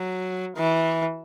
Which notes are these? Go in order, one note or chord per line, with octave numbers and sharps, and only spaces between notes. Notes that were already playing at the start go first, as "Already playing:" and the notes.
Already playing: F#3
E3